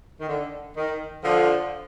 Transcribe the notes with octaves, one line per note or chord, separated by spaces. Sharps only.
D#3
D3
D#3
D3 F3